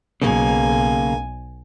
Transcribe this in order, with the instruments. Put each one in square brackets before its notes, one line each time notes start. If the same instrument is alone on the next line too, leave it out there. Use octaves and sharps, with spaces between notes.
[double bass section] B1 [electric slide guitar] C#3 A#3 [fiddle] G#5